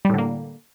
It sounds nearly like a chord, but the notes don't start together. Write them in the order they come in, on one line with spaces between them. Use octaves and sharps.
G3 A2 D3 A#3